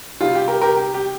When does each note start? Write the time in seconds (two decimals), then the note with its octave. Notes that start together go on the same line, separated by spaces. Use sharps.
0.21 C3 G3 F4
0.35 G4
0.48 G4 A#4
0.61 G4 A#4
0.76 G4
0.94 G4